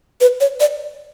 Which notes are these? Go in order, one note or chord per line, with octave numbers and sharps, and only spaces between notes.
B4
C#5
D5